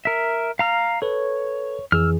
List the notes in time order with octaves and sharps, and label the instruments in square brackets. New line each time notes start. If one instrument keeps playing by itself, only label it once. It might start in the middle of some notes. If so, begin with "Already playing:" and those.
[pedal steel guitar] A#4 E5
F5 A#5 F6
[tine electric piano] A4 B4 [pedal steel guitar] C#5
[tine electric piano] F2 E3 G#4 [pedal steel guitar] E6 F6